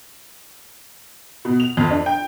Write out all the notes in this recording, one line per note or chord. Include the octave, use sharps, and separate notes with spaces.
B2
F7
F2
D4
G5